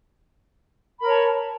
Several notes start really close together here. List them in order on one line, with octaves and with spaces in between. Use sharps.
B5 A#4 C#5 A5